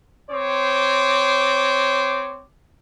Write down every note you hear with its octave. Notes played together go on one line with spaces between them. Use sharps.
C4 C5 C#5 D6